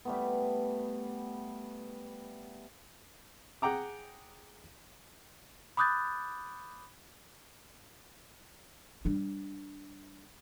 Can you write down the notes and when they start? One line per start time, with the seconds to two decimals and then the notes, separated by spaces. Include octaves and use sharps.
0.05 G3 A3 B3
3.62 G#4 F#5 G5 A#5 D6
5.77 B5 D6 D#6 F#6 G6 A6
9.05 G3 D4